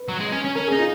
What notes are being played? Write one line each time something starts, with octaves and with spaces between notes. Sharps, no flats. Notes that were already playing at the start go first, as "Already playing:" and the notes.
Already playing: B4
F#3
G#3
C#4
C#4
C#4 A#4
G#4
D#4
F4